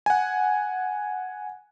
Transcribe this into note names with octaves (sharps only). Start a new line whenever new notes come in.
F#5 G#5